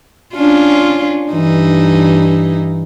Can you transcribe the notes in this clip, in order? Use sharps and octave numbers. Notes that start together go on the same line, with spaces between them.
C#4 D4 F4
G2 E3 D#4